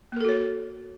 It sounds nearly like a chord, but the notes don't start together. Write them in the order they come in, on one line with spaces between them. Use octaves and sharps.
A#3 A#4 A4 F#4 C#5